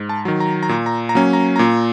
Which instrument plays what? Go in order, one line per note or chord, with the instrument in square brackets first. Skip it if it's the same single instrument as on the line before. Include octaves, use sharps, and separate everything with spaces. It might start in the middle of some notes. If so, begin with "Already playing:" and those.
Already playing: [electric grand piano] G#2
A5
D#3 F#3
A#5
A#5
A#2
A#5
A#5
F#3 A#3 C#4
A#5
A#2 A#5